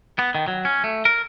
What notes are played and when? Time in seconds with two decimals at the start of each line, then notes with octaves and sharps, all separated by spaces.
0.19 B3
0.35 D#3
0.48 F#3
0.65 C#4
0.84 A3
1.05 A#4